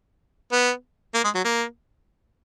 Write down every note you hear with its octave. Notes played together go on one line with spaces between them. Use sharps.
B3
A#3
G#3
F#3
A#3